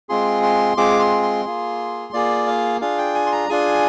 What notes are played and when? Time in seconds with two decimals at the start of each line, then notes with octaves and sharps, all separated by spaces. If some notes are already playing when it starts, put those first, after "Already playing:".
0.09 G#3 C4 F4 G#4 C6
0.43 C6
0.77 G#3 C4 F4 G#4 D6
1.00 C6
1.22 C6
1.45 A#3 F4 G#4
2.13 A#3 F4 G#4 D5
2.47 F5
2.81 D4 F4 G#4 F5
2.98 G5
3.15 G#5
3.27 C6
3.32 A#5
3.49 D4 F4 G#4 G#5